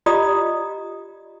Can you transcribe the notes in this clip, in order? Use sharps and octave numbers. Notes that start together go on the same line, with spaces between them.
F4 G4 D5 D#5 A#5 D#6